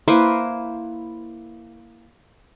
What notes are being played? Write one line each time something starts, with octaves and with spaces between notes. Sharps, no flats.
A#3 E4 B4 C5